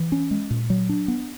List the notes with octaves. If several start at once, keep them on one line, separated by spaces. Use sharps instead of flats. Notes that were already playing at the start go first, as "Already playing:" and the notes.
Already playing: E3
C#4
G#3
A#2
F#3
D4
B3